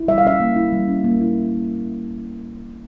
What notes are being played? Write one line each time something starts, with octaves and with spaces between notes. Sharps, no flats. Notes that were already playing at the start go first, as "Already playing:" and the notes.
Already playing: E4
G3 E5
F5
C#4 E5
A#3
E4
G3
C#4
A#3
E4